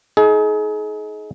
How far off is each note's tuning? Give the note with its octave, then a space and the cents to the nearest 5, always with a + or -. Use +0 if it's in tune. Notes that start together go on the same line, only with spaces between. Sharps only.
D#4 +20 G#4 +35